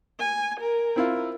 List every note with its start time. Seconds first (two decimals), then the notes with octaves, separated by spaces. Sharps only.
0.19 G#5
0.60 A#4
0.96 C4 E4 F4